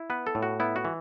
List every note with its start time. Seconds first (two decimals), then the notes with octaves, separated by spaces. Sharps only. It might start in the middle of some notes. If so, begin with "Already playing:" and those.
Already playing: E4
0.10 B3 B4
0.27 A4
0.35 A2
0.43 F#4
0.60 B3 E4
0.76 F#4
0.85 E3